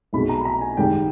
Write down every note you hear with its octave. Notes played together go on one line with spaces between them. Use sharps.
B1 B2 G#3 B5
A#5
B5
A#5
G#5
G#1 G#2 G3 G5